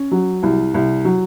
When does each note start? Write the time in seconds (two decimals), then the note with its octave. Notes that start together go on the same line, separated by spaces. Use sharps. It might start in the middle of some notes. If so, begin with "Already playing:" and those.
Already playing: C#4
0.11 F#3
0.43 C2
0.74 C2
1.05 F#3